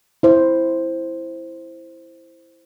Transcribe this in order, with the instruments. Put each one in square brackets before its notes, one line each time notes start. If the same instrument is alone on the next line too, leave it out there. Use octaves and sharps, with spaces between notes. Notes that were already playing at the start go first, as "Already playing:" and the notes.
[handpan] E4 C5